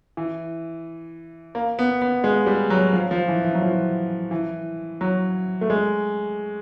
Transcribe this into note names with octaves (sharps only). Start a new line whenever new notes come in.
E3
A#3
B3
B3
G#3
G3
F#3
F3
F3
E3
E3
F#3
F3
E3
F#3
A3
G#3